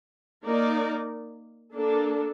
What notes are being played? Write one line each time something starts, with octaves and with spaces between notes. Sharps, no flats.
A#3 D#4 A#4 D5
A#3 D4 A4